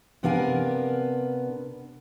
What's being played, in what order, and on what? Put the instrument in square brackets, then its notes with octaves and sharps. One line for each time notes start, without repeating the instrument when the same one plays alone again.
[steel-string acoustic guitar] C3 B3 D4 A#4 F5 G#5